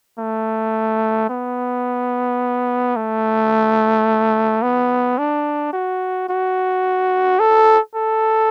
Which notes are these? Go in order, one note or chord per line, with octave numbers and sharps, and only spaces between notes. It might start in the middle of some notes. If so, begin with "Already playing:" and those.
A3
B3
A3
B3
D4
F#4
F#4
A4
A4